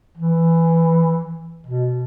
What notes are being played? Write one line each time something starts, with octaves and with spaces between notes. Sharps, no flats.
E3
B2